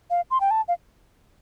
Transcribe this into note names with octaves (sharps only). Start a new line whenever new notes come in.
F5
C6
G5
A5
F5